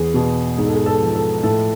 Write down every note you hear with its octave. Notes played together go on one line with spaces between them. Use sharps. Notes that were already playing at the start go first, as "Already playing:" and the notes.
Already playing: E2 G#4
B2
G#2 G#4
A4
G#4
A4
F3
A4
A2 A4